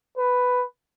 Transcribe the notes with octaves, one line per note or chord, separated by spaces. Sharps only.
B4